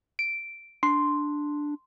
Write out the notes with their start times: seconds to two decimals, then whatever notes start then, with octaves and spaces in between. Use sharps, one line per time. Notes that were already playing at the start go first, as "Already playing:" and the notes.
0.19 D7
0.83 D4 C6